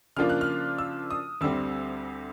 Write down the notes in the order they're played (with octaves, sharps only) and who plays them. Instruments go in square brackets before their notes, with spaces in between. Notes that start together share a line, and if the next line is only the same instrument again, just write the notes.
[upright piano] C#3 F3 A#3 D4 F4 F6
F#6
F6
E6
D#6
D2 D3 G3 C4 E6